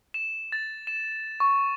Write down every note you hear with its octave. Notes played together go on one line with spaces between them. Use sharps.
E7
A6
E7
C#6